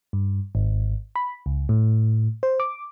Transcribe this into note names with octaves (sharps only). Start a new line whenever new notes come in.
G2
G#1
B5
C#2
A2
C5
D6